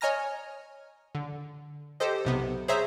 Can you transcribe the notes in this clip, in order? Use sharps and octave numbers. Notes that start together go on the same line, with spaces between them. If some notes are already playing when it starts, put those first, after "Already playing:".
C#5 D#5 G#5 A#5 F6 A#6
D3
G4 A4 C5 D#5
B1 C3 B3
G#4 C5 C#5 E5 A#5 E6